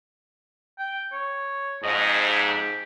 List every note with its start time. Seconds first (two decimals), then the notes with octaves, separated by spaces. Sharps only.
0.78 G5
1.12 C#5
1.83 F2 G#2 D#5
2.27 G4